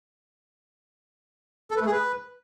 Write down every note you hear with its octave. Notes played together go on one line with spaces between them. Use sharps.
A4
B4
A3
G#4
B4